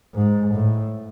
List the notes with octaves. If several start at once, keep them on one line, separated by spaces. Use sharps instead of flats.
G#2
A2